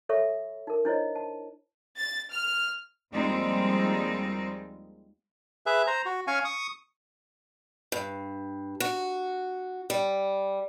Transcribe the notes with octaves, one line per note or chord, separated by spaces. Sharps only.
A4 C#5 E5 B5 C#6
D#4 A#4
D4 E4 C5 C#5 D#5
A5
A6
F6
D#2 F3 G3 G#3 C4 D#4
G#4 B4 E5
C5 A#5
F#4
C#4 F5 G#5 C#6
C#6 D#6
G2
F#4
G3